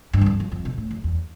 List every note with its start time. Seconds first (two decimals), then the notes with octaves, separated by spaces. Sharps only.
0.13 G2
0.21 E2
0.26 F2
0.40 F2
0.52 F2
0.65 B2
0.78 A2
0.91 F2
1.04 E2